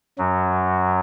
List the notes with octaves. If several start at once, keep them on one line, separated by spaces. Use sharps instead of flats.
F#2 F#3